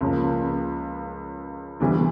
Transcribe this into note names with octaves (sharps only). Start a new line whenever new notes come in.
C#2 C#3 F3 A#3
D2 C3 E3 G3 B3